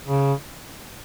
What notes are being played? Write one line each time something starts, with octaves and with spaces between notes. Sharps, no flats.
C#3